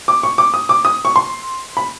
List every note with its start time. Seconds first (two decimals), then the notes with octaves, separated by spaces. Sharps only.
0.08 D6
0.23 C#6
0.38 D6
0.54 D#6
0.69 D6
0.85 D#6
1.05 C#6
1.16 C6
1.77 B5